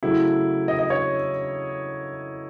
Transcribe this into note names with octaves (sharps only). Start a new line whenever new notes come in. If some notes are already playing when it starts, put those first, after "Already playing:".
C#3 F#3 A3 E4
D#5
D#5
C#5